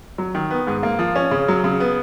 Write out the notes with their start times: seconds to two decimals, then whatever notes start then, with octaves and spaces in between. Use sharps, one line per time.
0.18 F#3
0.35 D#3
0.51 B3
0.67 G#2
0.83 A#3
0.99 F3
1.16 C#4
1.31 C#3
1.48 F#3
1.64 C#3
1.80 B3